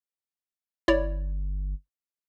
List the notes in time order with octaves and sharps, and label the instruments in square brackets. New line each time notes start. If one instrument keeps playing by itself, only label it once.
[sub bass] G1 [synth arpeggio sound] E4 C#5 D5